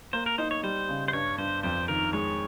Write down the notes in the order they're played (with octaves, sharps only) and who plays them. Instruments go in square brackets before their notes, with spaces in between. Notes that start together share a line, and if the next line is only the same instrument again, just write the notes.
[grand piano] A#3 [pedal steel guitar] C5
[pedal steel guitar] A#4
[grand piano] D#4 [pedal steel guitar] C5
[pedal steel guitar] C#5
[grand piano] G3 [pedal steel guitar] C5
[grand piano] C#3
[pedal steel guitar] C5
[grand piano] G2 [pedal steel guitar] C#5
[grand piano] G2 [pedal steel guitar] C5
[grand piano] F2 [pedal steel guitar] C5
[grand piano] D#3 [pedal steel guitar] A#4
[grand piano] G#3 [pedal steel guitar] C#5